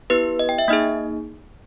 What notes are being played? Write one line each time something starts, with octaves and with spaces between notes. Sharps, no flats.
B3 E4 G4 B4
D#5
G5
E5
A#3 D#4 G#4 D#5